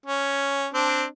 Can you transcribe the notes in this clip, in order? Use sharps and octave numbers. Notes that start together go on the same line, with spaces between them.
C#4
C4 D4